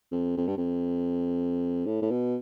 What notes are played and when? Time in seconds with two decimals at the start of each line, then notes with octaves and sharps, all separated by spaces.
0.12 F2
0.37 F2
0.47 G2
0.57 F2
1.86 A2
2.02 A2
2.11 B2